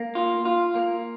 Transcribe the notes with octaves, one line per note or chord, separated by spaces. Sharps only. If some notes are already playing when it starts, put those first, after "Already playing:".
Already playing: A#3
F4
F4
A#3